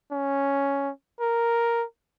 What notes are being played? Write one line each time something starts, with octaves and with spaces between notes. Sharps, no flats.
C#4
A#4